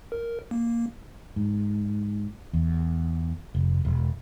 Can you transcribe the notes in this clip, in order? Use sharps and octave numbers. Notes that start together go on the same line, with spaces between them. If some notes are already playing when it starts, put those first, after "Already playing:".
A#4
A#3
G#2
E2
F1
E1